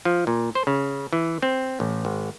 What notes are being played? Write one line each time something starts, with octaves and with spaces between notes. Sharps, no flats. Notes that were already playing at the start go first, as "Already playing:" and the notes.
F3
A#2
C5
C#3
E3
C4
A1
G#1